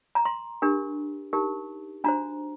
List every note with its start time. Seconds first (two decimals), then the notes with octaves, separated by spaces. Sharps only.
0.15 A#5
0.25 C6
0.62 D4 G4 A#4
1.33 D#4 G4 A#4
2.04 D4 F#4 C5 A#5